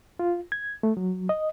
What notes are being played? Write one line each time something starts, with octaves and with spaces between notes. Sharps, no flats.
F4
G#6
A3
F#3
D#5